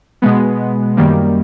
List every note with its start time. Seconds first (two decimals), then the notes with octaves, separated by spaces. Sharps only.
0.22 B2 G#3 B3
0.97 F#2 D#3 G3 A#3